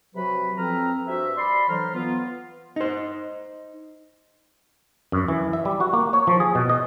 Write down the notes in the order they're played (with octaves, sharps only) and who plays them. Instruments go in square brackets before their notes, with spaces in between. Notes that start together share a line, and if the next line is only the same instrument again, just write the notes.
[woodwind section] C3 F#3 F#4 B4 B5
F2 F3 C4 B4 A#5 F6
G2 F#4 C5 E5
D5 B5 C6
D3 E3 F#3 C5 A#5 F6
B3 F4
[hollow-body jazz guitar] D#4 C5
[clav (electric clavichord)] F#2
E3
E5
G3
F#4
A#3
C#5
F3
G#4
B2
D#5